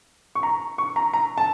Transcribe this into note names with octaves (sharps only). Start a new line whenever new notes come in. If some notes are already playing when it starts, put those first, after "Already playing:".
C#6
A#5
C#6
A#5
A#5
A5